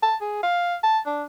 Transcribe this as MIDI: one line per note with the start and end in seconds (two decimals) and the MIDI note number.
0.03 0.16 81
0.21 0.38 68
0.43 0.75 77
0.83 0.99 81
1.06 1.23 62